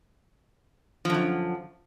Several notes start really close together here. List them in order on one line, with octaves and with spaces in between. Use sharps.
F3 D3 F#2